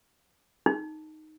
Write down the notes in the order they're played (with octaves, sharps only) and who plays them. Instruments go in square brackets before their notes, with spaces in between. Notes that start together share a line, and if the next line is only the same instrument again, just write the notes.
[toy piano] D#4